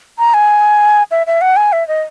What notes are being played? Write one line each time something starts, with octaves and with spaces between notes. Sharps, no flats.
A#5
G#5
E5
E5
F#5
G#5
E5
D#5